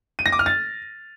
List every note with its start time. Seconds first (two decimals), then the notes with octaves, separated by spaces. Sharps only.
0.19 D#7
0.26 A#6
0.32 D6
0.39 F6
0.46 A6